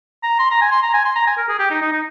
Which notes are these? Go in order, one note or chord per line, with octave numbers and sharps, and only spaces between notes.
A#5
C6
A#5
G#5
C6
A#5
G#5
C6
A#5
G#5
A#4
G#4
G4
D#4
D#4
D#4